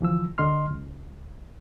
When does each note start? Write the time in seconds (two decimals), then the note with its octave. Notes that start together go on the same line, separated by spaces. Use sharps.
0.01 D2 E3 F3 E6
0.38 D2 D3 D#5 C6 F6
0.71 C#2